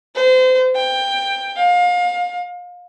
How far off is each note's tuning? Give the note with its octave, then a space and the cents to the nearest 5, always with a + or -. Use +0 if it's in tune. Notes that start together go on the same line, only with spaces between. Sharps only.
C5 -30
G5 +15
F5 +30